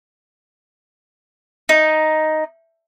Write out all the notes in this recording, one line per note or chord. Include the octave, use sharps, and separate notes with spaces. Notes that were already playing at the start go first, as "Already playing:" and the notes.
D#4